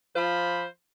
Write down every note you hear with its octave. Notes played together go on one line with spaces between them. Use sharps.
F3 F4 C5 B5